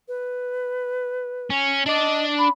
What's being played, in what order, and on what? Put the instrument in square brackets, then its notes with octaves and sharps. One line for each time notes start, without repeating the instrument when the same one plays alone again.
[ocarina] B4
[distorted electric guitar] C#4
[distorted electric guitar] D4 D5 [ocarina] D#5
[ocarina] B5